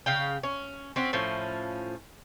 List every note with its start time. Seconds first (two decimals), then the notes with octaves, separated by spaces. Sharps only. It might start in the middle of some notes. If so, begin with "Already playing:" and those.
0.06 C#3 F5 G5
0.43 C#4
0.96 C4 C#4 F#4
1.13 A2 F3 C#4